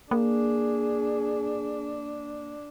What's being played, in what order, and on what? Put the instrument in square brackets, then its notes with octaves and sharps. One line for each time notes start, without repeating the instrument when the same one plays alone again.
[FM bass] A#3 [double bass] D4 [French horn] G#4